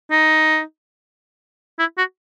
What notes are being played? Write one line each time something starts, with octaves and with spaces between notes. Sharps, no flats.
D#4
E4
F#4